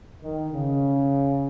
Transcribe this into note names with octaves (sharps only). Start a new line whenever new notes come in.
D#3
C#3